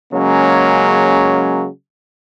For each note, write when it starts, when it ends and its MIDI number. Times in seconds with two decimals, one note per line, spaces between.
0.14 1.68 49
0.14 1.68 54
0.14 1.68 56
0.14 1.68 58
0.14 1.68 61